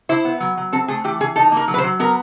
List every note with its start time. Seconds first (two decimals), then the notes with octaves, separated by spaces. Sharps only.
0.09 E4 C5
0.25 B3
0.40 F#3
0.57 F#3
0.72 C4 A4
0.88 A3 G#4
1.04 E3 G4
1.21 E3 G#4
1.36 D#4 A4
1.52 A#3 A#4
1.68 F#3
1.74 B4
1.78 C5
1.84 F#3
2.00 B3 A#4